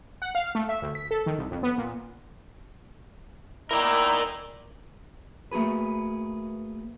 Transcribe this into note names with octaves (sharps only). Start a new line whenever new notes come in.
F#5
F5
A3
E5
D2
B6
A4
D#3
C2
F2
B3
A#2
D#3 D#4 E4 A#4 D5
A3 A#3 F#4 G#4 B4